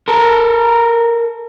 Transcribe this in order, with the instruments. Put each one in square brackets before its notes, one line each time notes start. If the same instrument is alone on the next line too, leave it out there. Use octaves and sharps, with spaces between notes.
[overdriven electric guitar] A4 A#4